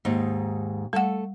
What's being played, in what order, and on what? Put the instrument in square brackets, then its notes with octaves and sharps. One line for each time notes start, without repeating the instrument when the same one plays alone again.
[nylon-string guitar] D#2 G#2 D#4
[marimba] G3 F#5 [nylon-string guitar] A3 A4